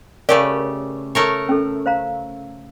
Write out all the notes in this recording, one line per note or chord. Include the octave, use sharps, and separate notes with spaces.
C#3 A3 G4 A#4 C#5 D5
A3 A#4 C#5
C#4 A4
C5 F5 A#5